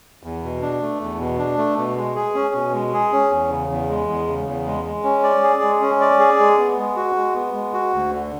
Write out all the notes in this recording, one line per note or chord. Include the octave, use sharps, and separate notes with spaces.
E2
B2
D4
A3
E2
B2
D4
A3
B2
G#3
G#4
C#4
B2
G#3
G#4
C#4
E2
C#3
E2
G#3
E2
C#3
E2
G#3
G#3
C#4
D5
G#4
G#3
C#4
D5
G#4
G#3
B3
G#3
F#4
G#3
B3
G#3
F#4
D2
D3